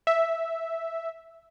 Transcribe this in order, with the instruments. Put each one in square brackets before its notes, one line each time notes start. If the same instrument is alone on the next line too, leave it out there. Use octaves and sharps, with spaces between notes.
[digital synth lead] E5